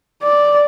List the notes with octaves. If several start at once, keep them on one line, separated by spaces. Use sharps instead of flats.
D5